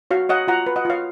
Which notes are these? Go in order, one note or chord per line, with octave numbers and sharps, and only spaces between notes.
F#4 C#5 F5
C#5 D#5 F#5
F4 F#5 A#5
B4
D#5 F#5
F4 C#5 F5